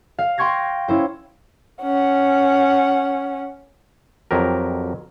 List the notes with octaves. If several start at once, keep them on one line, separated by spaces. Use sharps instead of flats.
F5
G5 C6 C#6 G#6 A#6
C#4 E4 C5
C#4 F#5
F2 F#3 G4 A#4